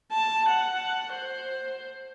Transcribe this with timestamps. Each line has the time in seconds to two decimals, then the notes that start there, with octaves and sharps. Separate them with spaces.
0.12 A5
0.49 F#5
1.13 C5